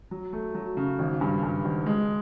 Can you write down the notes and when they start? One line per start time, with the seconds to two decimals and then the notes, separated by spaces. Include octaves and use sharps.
0.11 F#3
0.33 A3
0.55 F#3
0.77 C#3
0.99 G#1
1.21 G2
1.43 G2
1.64 G#1
1.86 G#3